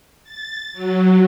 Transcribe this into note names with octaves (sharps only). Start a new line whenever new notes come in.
A6
F#3